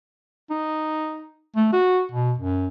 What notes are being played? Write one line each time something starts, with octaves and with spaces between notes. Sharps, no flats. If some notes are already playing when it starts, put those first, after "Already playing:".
D#4
A3
F#4
B2
F#2